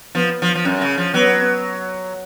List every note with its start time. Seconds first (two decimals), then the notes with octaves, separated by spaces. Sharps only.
0.15 F3 B3
0.42 F3
0.55 F3
0.65 F#2 C#4
0.82 C#3
0.98 F3
1.14 F#3 B3